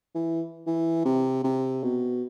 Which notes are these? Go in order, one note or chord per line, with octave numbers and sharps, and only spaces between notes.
E3
E3
C3
C3
B2